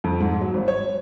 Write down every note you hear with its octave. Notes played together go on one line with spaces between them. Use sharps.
F2
G#2
F#3
G#1
C#5